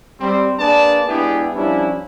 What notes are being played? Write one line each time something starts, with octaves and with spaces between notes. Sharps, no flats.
G3 C4
A#3 D4 G#4 B4 D5 A5
G#3 B3 D4 E4 G4 G#4
F3 G3 C#4 D4 E4